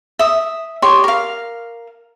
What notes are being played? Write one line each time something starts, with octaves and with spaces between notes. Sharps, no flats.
E5 D#6
G4 C#5 C6
A#4 F5